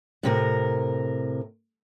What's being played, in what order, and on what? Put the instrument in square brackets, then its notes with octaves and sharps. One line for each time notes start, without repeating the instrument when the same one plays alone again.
[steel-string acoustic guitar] A2 C3 A#4